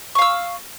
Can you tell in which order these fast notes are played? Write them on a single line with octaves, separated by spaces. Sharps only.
C#6 F5 E6